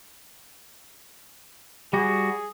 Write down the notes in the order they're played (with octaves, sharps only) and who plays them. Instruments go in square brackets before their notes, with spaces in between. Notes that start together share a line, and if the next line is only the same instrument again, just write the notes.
[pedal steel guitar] G3 F#4 [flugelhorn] G#4